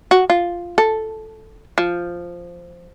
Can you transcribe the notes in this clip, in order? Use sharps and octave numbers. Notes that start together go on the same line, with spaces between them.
F#4
F4
A4
F3